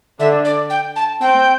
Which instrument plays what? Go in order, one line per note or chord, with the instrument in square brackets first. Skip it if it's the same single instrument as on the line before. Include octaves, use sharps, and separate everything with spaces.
[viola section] D3 D4 [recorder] E5
[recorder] D5
G5
A5
[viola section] C4 [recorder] G5